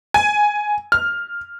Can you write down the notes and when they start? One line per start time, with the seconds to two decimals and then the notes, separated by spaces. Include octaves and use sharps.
0.14 G#5
0.92 F6